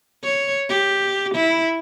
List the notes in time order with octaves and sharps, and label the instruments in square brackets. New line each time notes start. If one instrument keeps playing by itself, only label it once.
[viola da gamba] C#5
G4
E4